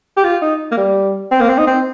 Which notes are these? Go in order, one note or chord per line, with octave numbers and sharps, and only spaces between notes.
G4
F4
D#4
A#3
G3
C4
A#3
C4
D#4
C4